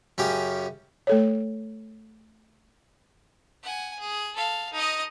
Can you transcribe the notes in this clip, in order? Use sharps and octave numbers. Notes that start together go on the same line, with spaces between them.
F#2 C#3 C#4 G4
A3 A4 C#5
F#5 G#5
G#4
A4 F5
D#4 D#5